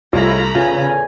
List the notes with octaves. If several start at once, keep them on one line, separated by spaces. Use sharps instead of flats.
C2 G#3 A3 C#4 E4 F4 A#5 B5
E2 A2 C#3 F4 G#5